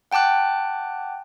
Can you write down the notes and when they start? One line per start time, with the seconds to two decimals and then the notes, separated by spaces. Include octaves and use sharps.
0.11 F#5 G5 A5 D6 F#6